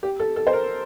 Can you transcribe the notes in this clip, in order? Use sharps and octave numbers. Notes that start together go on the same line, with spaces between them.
G4
A4
A4
C5
A#4